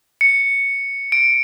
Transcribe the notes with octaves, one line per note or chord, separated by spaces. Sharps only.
C#7
D7